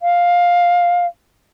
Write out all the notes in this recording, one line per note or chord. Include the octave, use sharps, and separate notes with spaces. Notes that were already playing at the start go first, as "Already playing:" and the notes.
F5